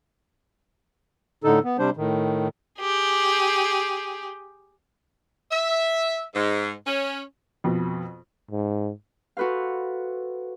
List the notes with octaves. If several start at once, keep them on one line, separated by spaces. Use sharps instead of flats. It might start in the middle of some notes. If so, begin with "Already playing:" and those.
A2 D3 D#4 A4
B3
C3 G3 D4 C5
A2 D#3
G4 G#4
E5
G#2
C#4
F2 B2
G#2
F#4 A4 B4 C5 F5